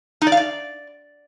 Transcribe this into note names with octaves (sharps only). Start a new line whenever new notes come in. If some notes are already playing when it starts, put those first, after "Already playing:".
D#4
D5
F5
D5